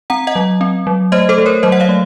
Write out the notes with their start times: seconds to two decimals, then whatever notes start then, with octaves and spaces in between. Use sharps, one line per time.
0.10 C4 F#5 A#5
0.27 D#5 F#5
0.36 F#3
0.61 C4
0.87 F#3
1.12 A3 C5 D#5
1.29 A4 C5
1.38 A3
1.46 A#4 C#5
1.63 F#3 C5 D#5
1.72 F#5
1.80 C#5 F5
1.89 A3